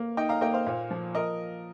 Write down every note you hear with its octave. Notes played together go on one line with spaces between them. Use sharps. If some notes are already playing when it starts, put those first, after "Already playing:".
Already playing: A#3
D#4 D#5 G5
F5 A#5
A#3 D#5 G5
C5 F5
A#2
F3
A#4 D#5